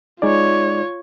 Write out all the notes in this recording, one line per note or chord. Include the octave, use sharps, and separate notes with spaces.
G#3 D#4 F4 C#5 D5